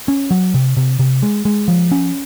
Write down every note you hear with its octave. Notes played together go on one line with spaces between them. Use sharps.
C#4
F#3
C3
C3
C3
G#3
G#3
F3
C#4